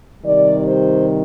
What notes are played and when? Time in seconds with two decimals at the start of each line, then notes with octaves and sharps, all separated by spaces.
0.24 C3 D#3 G3 D5
0.67 C5